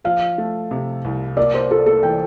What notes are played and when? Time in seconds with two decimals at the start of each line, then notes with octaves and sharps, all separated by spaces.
0.04 F3 F5
0.38 A3
0.71 C3
1.05 C2
1.37 A#3 D5
1.54 C5
1.71 F4 A4
1.86 A4
2.03 E3 G5